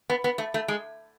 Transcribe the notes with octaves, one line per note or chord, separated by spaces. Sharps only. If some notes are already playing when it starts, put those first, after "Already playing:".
B3
B3
A3
A3
G#3